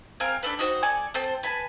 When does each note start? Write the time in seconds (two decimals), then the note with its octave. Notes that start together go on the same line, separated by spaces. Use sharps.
0.20 C4 G#4 A#4 F5
0.43 D4 A4 B4
0.59 D#4 F#4 C5 G5
0.83 A4 D5 G#5
1.14 C4 A4 C5 G5
1.43 B4 G#5 A5